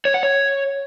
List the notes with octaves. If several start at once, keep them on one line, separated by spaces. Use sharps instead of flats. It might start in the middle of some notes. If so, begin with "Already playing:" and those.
C#5
F#5
C#5